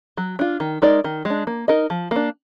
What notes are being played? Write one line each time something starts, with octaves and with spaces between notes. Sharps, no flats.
F#3
D4 F4
D#3
G#3 D#4 A#4 D5
D#3
G#3 D4
A#3
D#4 A#4 D#5
F3
A#3 D4